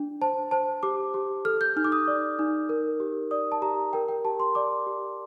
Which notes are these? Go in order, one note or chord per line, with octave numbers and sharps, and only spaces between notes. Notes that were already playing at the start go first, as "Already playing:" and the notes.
Already playing: D4
C5 A5
C5 A5
G4 D6
G4
A4 F6
G6
D#4 F6
D6
D#6
D5
D#4
A#4
G4
D5 D#6
A5
G4 A#5
A#4 G5
G5
G4 A5
C6
D5 D6
G4